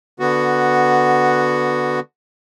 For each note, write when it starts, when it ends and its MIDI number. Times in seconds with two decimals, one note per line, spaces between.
0.20 2.00 50
0.20 2.00 59
0.20 2.00 66